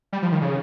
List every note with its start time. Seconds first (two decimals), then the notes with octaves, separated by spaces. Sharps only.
0.13 G3
0.22 F3
0.32 D#3
0.42 C#3